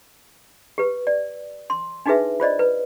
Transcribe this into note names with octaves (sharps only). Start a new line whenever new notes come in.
G4 B4
D5
C6
D4 D#4 F#4 G#4 B4 E5
F4 C5 D5 D#5
B4